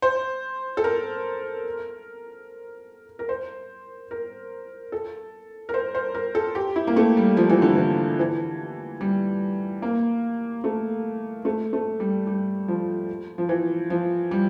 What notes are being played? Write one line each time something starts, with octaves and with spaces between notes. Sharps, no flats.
C5
A4
A#4
A#4
C5
A#4
A4
A#4
C5
C5
A#4
A4
G4
E4
A#3
A3
G3
F3
E3
D3
E3
E3
G3
A#3
A3
A3
A3
G3
G3
F3
F3
E3
F3
G3